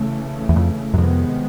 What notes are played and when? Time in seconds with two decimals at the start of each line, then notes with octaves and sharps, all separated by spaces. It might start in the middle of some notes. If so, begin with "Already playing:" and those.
Already playing: C#3 E3 A3
0.49 E2
0.56 F2
0.94 F#2
0.98 F2 C3 D#3 G#3 B3